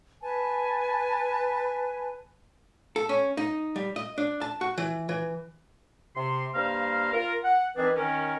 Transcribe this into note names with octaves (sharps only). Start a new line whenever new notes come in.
B4 G#5 A5
A4
C#4
D#4
G3
D#5
D4
A5
F#4
E3
E3
C3 C6
G2 A#3 C5 F5 A#5 F6
F4 A#4
F#5
D#3 E3 C4 D4 G#4 B4
D#3 C#4 A#4